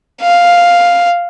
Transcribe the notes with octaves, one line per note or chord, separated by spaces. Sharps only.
F5